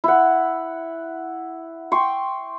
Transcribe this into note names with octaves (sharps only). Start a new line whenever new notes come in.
E4 F#5
G5 C6 C#6